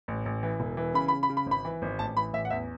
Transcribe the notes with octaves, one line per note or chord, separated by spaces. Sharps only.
A1
A1
E3
E1
E3
C#3 B5
B5
C#3
B5
C#3
B5
G#1
B5
E3
G#1
A1 A5
E3 B5
A1 E5
F#5
E2 E5